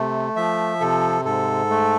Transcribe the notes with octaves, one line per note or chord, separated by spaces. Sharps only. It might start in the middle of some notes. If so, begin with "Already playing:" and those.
Already playing: C3 A3
F3 E5
C3 A4
G#2 A4
A3